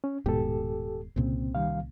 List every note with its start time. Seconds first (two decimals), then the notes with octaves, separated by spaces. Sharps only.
0.04 C#4
0.26 D#1 G#2 B2 G4 A4
1.16 C2 A#2 C#3 C4
1.55 D#3 G3 F5